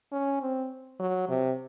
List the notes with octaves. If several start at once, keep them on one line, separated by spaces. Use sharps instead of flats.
C#4
C4
F#3
C3